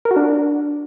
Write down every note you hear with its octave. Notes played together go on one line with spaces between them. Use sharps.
A#4
F#4
D4